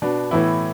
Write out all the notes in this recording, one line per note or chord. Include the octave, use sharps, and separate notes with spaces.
B2 B3 D4
A2 E3 B3 E4